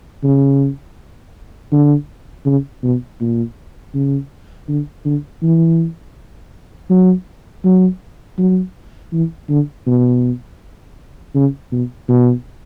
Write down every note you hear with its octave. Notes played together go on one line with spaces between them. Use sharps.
C#3
D3
C#3
B2
A#2
C#3
D3
D3
E3
F#3
F#3
F#3
E3
D3
B2
C#3
B2
B2